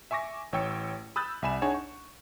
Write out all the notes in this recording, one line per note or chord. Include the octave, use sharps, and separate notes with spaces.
E5 G#5 C#6 D6 A#6
A1 C#5 G5 E6 C#7
B5 D#6 E6 F#6 G6 A6
C2 E5 G#5 B5 E7
D4 D#4 G#4 C#5 F#5 G#5
C#6